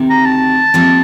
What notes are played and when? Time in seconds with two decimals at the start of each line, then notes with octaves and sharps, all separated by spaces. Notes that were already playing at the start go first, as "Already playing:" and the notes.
Already playing: D2 C3 D#3
0.10 A#5
0.25 A5
0.74 C3 F3 A#3